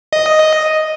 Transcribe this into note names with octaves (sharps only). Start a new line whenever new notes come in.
D#5